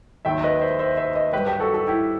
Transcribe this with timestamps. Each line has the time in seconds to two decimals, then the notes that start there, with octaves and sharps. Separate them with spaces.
0.25 D#2 D#3 F#3 E5 G5
0.43 B4 D#5
0.61 C5 E5
0.79 C5 E5
0.97 C5 E5
1.15 B4 D#5
1.33 G2 F#3 G4 B4
1.47 G4 B4
1.60 F#4 A4
1.74 F#4 A4
1.87 E4 G4